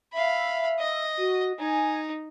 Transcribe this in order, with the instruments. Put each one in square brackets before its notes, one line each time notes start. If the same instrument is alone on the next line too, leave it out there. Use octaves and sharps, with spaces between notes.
[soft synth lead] E5 [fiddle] F5 B5
[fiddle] D#5
[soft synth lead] F#4
[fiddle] D#4 [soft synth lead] G#5